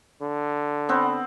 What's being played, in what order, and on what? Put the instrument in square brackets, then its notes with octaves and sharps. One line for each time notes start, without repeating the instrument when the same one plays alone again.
[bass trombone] D3
[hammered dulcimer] B3 C4 B4